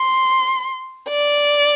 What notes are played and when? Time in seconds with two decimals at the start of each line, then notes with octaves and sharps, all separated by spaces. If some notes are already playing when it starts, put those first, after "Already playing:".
Already playing: C6
1.10 D5